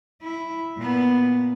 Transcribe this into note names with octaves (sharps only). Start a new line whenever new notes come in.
E4
A#2 B3